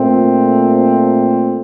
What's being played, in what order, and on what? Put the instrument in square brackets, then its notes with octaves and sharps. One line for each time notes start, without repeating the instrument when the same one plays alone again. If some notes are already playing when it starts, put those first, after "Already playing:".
Already playing: [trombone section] A#2 A3 C4